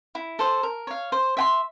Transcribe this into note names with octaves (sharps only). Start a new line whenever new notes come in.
E4
A4 C5
A#4
C#5 F5
C5
E5 G5 C6